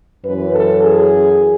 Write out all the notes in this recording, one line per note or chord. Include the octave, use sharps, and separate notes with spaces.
F#2 B4
E3
A4
G#4